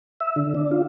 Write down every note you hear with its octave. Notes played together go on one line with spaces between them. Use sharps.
E5
D3
D4
F4